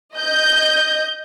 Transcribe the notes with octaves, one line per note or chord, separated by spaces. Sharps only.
D#5 G6